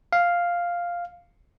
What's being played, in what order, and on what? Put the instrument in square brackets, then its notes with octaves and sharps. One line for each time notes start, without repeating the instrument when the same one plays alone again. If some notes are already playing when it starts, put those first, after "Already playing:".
[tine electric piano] F5